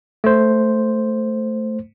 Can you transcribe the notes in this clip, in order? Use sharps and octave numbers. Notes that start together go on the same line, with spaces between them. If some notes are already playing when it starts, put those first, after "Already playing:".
A3 C5